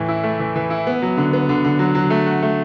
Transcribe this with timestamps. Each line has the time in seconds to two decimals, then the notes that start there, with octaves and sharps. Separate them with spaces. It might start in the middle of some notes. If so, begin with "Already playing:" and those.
Already playing: A2 E3
0.08 E4
0.23 A3
0.40 E3
0.56 E3
0.70 E4
0.87 B3
1.02 F#3
1.17 D3
1.33 B3
1.49 D3
1.65 D3
1.79 F#3
1.95 F#3
2.10 A3
2.26 F#4
2.43 A3